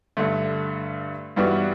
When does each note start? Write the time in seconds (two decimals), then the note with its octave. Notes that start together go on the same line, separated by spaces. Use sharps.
0.17 G2 D3 A3
1.36 G2 E3 G3 B3 F#4